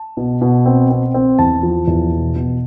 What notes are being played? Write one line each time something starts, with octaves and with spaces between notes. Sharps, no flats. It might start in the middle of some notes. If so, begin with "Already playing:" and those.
Already playing: A5
B2
B2
C4
C4
C4
E2 A5
F3
E2
B2
B2